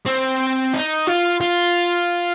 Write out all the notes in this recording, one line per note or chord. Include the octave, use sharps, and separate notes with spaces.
C4
D#4
F4
F4